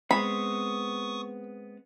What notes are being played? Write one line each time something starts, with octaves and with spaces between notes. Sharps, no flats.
G#3 B3 C4 B5 C#6 D#6